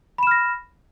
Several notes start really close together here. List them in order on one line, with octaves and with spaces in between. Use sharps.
B5 E7 F6 A#6